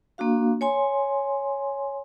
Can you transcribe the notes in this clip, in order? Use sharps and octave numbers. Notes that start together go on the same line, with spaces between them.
A#3 D4 F#4 F5
C#5 G#5 C6